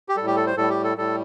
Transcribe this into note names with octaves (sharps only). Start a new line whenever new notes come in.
G4
A2 G3 A4
G4
A4
C5
A2 G3 A4
G4
A4
A2 G3 A4